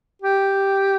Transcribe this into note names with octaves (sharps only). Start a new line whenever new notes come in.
G4